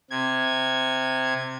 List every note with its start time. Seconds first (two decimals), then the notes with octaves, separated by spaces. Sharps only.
0.10 C3 G#6